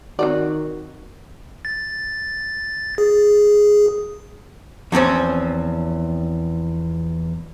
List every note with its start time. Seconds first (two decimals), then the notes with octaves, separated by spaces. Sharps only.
0.19 D#3 C4 D#4 F#4 D5
1.65 A6
2.98 G#4
4.92 E2 F3 C4 C#4